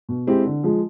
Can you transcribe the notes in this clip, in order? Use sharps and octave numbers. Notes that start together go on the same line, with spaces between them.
B2
G#3 C4 E4 G4
D3
F3 G#3